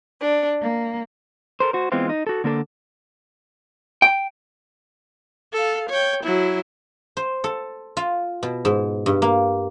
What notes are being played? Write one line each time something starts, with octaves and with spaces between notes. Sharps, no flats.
D4
A#3
A4 A#4 C5
F#4 C5
E3 G#3 B3 C4 F4
D#4
F#4 A4
D3 A#3 D4 A4
G5
A4 F5
C#5 G5
F#3 E4
C5
A4
F4
B2
G#2
G2
A#3